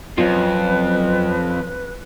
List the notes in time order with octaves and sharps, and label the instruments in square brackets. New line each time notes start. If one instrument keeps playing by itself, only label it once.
[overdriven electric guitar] F2 [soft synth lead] F#3 [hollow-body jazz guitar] C4 C#4 F4 [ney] B4